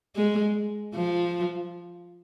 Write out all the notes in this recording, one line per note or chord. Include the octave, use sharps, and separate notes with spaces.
G#3
F3